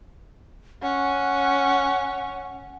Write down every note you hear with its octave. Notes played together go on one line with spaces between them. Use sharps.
C#4 F#5